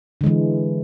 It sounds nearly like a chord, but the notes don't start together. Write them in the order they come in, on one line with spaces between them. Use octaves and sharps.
D3 G#3 E3